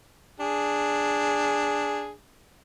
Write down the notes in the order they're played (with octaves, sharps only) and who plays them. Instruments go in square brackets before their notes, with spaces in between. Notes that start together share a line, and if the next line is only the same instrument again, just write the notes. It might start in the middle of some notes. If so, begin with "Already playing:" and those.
[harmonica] D4 G#4